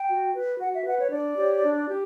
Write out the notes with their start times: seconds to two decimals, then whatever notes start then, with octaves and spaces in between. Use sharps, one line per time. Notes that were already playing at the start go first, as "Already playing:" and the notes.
Already playing: G5
0.08 F#4
0.34 B4
0.59 F#4 F#5
0.73 E5
0.85 B4 F#5
0.99 C#5
1.11 D4 D5
1.37 G4 C#5
1.63 D4
1.88 G4